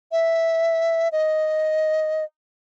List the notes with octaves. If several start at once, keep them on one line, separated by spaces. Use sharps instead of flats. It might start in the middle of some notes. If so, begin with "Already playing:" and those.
E5
D#5